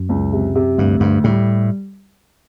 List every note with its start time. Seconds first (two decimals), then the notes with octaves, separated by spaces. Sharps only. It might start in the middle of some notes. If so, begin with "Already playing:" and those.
Already playing: F#2
0.09 C#2
0.33 C3
0.55 C3
0.78 D2 G2
1.00 D2 G2
1.24 A2 G3